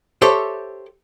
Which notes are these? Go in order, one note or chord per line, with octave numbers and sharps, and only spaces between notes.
G4 A4 C5 C#5 E5